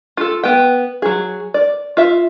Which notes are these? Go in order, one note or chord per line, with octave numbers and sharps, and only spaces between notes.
F4 A4
B3 G5
F#3 G#4
D5
F4 E5